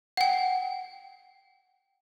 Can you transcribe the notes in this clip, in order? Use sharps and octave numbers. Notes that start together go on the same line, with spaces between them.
F#5 G5